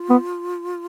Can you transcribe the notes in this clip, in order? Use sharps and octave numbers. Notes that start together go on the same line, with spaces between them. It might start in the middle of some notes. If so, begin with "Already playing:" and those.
Already playing: F4
B3